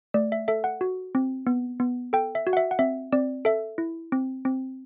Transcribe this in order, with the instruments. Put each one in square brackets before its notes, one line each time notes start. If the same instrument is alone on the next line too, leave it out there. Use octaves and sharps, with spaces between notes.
[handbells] A3 D5
E5
A4 E5
F#5
F#4
C4
B3
B3
A4 G5
E5
F#4
F#5
E5
F#5
C4 E5
C4 D5
A4 E5
E4
C4
C4